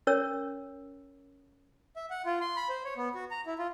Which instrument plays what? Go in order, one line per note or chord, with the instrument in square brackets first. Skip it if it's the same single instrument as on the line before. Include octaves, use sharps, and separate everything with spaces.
[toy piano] C#4 A#4 C#5 E6
[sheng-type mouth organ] E5
F#5
F4
C6
B5
C5
C#5
B3
F#4
A#5
E4
F4